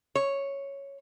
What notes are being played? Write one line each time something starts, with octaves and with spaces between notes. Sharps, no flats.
C#5